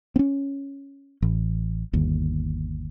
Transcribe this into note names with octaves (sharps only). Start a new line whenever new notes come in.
C4 C#4
A1
G1 D#2